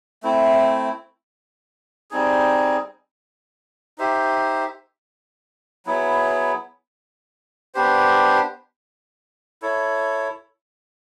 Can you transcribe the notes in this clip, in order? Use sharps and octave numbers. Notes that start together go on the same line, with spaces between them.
A3 C4 E4
G3 C4 D#4 G#4
D#4 G4 C5 E5
F#3 B3 E4 G#4
B3 D4 G4 C5
E4 A4 C#5